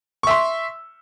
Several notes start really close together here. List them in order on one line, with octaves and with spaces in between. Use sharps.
C#6 E5 C6